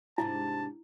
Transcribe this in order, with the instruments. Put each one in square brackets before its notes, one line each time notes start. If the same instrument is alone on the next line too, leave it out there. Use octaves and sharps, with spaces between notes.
[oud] G#2 C3 D4 [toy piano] E4 [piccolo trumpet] A5